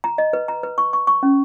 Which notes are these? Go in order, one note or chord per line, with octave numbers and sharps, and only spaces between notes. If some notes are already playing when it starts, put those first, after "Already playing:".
A#5
D#5
B4
A#5
B4
C#6
C#6
C#6
C#4